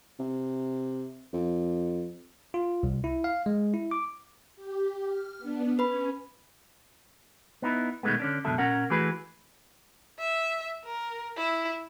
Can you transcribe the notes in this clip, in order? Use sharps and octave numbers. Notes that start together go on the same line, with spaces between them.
C3
F2
F4
C2
E4
F5
G#3
E4
D6
G4
F6
B3 D4
C#4 B4 B5
B3 D#4 E4
B2 D#3 E3 G#3 A3 B3
D3 C#4 D4
C#2 F#2 B2 D3 A4 E5
A#2 C#4 A#4 F#5
E3 A3 F#4 G#4 B4
E5
A#4
E4